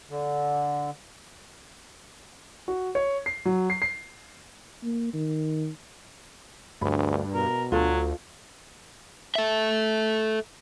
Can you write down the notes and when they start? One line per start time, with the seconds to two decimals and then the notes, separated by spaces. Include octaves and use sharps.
0.10 D3
2.68 F#4
2.95 C#5
3.26 C7
3.45 F#3
3.70 C7
3.82 C7
4.83 A#3
5.14 D#3
6.81 D2 G2 B5
7.34 B2 A#4
7.72 D2 F#3 F4 A4
9.35 A4 E5